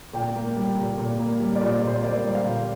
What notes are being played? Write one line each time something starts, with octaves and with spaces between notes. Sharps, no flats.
A#2 G5
A#3
G3
A#2
A#2
A#3
G3
D5
A#2
C5
A#2 C5
A#3 D5
G3
F5
A#2